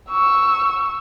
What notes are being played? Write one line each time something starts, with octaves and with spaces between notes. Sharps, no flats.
C#6 E6